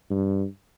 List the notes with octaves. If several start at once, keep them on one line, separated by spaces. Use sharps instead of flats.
G2